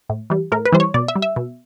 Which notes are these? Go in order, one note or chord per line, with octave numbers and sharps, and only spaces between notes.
A2
E3 G3
A2 A#4
B4
E3 G3 C5
C#5
B2 D5
E5
G3
E5
B2